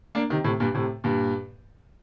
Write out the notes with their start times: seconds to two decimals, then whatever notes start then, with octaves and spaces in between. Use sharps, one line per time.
0.15 A#3 D4
0.30 C3 D#3
0.44 A2 C3
0.60 G2 A#2
0.74 A2 C3
1.04 G2 A#2